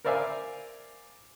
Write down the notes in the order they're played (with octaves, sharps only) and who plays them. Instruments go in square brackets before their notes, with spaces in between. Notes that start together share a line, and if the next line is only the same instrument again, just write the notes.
[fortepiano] A#4 C5 D5 E5 F5 G#5